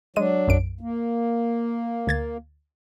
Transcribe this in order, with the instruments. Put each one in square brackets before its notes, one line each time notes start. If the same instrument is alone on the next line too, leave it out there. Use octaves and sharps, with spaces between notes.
[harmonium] F#3 D4 [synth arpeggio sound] G#3 D#7
[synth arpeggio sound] B1 F#2 D7
[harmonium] A#3
[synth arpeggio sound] D2 G#6 A6